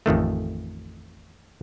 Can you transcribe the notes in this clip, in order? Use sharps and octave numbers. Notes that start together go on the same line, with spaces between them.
A1 F2 D#3 A3